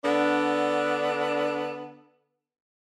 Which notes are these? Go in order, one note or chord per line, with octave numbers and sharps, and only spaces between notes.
D3 B3 D4